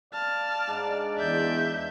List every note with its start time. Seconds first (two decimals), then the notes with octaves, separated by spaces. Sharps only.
0.13 D5 F5 A5 F6
0.68 G#2 D4 D#4
1.18 E2 E5 G6